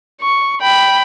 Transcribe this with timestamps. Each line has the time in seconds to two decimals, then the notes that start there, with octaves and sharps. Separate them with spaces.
0.21 C#6
0.61 G5 B5